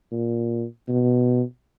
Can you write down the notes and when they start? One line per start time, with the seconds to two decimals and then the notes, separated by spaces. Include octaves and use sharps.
0.12 A#2
0.88 B2